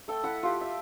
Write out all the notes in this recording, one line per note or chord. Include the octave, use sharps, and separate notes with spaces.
A3 A4 G5
E4 F#5 B5
F4 G4
E5